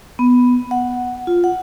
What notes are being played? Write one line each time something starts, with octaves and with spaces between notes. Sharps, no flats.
B3
F#5
F4
F#5